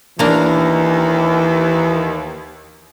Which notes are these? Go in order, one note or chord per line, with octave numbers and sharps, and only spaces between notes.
D#2 E3 A#3 D4